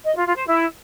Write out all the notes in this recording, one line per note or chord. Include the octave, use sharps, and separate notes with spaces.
D#5
F4
F4
C5
E4